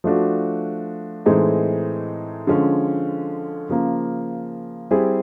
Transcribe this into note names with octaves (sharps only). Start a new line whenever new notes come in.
F3 A3 D4 F#4
A2 E3 G#3 C4 D#4
D3 F3 G#3 C#4
C#3 F3 A#3
G3 C4 E4 G#4